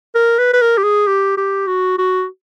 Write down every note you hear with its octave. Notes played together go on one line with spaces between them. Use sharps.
A#4
B4
B4
A#4
G4
G#4
G4
G4
F#4
F#4